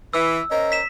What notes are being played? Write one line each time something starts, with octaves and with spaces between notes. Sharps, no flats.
E3 E6
C#4 A#4 C5 D#5
B6 E7